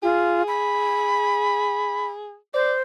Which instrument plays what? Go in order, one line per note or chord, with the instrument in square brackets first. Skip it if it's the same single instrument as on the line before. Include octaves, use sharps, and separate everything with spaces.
[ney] F4 [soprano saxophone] G#4
[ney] B5
[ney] C5 [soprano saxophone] D5